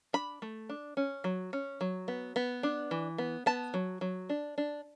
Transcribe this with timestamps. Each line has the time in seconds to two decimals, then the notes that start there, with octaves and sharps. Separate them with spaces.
0.13 D4 B5
0.42 A3
0.69 D4
0.97 C#4
1.24 F#3
1.53 C#4
1.81 F#3
2.08 B3
2.36 B3
2.63 D4
2.91 E3
3.18 B3
3.46 B3 A5
3.74 F#3
4.01 F#3
4.29 D4
4.58 D4